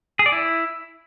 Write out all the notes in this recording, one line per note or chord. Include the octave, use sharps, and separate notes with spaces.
G#4
D5
E4